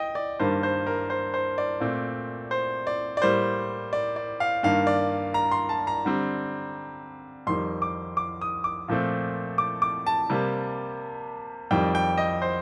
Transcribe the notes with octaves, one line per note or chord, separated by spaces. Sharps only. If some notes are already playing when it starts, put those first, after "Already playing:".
Already playing: D#5 G5
D5
G2 D#3 G3 A#3 C5
C5
A#4
C5
C5
D5
A#2 A3 C4
C5
D5
D5
A2 G3 A#3 C5
D5
D5
F5
G2 D#3 A#3 F5
D5
A#5
C6
A5
A#5
D3 G3 C4
F2 D#3 G3 C6
D6
D6
D#6
D6
A#2 F3 A3 C4
D6
D6
A5
C3 G3 A#3
F2 D#3 G3 G5
G5
D#5
C5